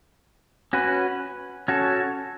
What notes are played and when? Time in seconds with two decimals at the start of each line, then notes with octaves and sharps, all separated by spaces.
0.73 C#4 F#4 B4
1.68 C#4 F#4 A4